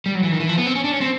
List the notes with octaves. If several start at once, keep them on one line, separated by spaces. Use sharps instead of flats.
G3
F#3
E3
D#3
E3
F3
B3
C4
C#4
D4
C#4
C4